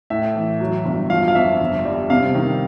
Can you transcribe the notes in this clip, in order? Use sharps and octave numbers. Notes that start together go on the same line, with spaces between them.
A2 E5
E3
F#3
G1
F3 F5
F5
F2 E5
G1
G3
C3 F5
D#3